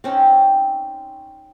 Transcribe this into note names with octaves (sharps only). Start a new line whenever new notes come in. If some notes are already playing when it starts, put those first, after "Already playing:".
C4 C#4 D#4